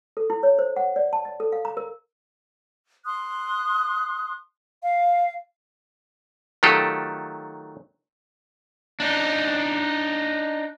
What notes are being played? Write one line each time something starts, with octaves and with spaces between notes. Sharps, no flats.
A4
E4
C#5
C5
F#5
D5
A5
D#5
A4
F5
A#5
A#4
C6 D#6 F#6
F5
D#3 F#3 A3 F4 G4 A4
D4 D#4